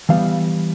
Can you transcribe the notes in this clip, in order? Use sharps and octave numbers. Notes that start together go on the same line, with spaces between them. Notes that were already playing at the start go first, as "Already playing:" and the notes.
E3 G3 B3 F5